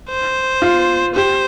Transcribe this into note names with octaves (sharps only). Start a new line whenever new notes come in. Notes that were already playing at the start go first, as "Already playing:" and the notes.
C5
F4
G4 C5